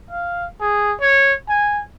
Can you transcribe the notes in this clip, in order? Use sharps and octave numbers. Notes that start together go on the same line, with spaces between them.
F5
G#4
C#5
G#5